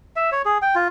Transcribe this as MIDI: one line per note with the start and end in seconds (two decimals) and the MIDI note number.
0.16 0.30 76
0.32 0.42 73
0.45 0.58 68
0.62 0.75 79
0.75 0.88 65